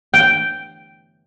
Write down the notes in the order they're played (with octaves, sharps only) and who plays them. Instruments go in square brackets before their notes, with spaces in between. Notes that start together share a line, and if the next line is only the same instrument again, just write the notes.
[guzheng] G5